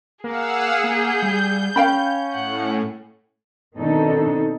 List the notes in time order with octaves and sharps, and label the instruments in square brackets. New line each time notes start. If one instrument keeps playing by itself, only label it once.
[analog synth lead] A#3 [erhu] G#4 [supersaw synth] F5 F#5 E6
[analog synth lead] A#3 [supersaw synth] G6
[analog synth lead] G3
[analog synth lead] C#4 [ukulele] F5 G5 B5
[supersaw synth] A2 [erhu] F#5
[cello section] B2 D#3 C4 D4 D#4 A4